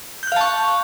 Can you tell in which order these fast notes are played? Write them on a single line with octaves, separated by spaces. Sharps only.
G6 F#6 F5 A5 C#6